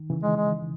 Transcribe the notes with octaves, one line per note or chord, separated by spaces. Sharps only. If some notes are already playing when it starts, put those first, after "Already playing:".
Already playing: D#3
C#3 E3
G#3
G#3